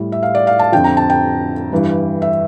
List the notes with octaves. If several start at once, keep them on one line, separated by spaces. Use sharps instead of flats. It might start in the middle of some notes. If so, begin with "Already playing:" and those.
Already playing: A2 G3
E5
F5
D5
F5
A5
F2 D3 F3 G5
A#5
A5
G5
G2 E3 G3
E5